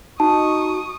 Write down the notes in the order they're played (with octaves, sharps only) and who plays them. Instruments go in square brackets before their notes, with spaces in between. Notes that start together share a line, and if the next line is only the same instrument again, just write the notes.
[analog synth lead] D#4 [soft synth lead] F#4 [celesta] A5 [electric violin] C#6 D#6